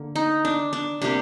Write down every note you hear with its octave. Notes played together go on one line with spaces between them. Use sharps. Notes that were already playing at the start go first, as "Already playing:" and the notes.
Already playing: D3 A#3
D#4
D4
D4
C3 G3 A#3 D4